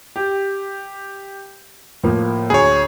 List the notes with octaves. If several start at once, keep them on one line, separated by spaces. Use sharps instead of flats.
G4
A2 F3 A#3
D2 G#4 C#5